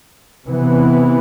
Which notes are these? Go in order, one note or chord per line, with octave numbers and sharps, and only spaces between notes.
C3 E3 B3